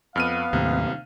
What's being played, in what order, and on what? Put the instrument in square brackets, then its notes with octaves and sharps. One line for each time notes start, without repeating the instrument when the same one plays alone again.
[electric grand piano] F2 F6 D#7 [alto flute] B3 [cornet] F5
[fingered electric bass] D#2 A2 [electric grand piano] C3